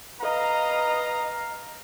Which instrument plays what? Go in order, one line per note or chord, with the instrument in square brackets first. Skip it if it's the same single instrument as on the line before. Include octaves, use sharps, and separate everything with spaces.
[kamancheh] B4 D#5 [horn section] F5 A#5